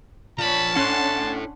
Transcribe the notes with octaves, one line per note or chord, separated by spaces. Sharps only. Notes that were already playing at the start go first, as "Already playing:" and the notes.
F3 D4 C#5 A5 B5
C#4 D4 E4 A4 F#5 C6